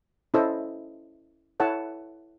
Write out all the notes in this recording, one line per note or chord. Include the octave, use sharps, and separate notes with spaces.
C#4 E4 A4 C5 D#5
E4 A4 C#5 F#5 A5